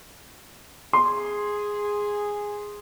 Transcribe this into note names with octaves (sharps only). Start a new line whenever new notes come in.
G#4 C6